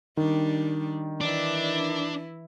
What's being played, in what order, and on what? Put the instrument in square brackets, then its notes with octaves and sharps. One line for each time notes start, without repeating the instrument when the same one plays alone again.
[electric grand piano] D#3 [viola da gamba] G3 D4
[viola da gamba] E3 E4 [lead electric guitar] D4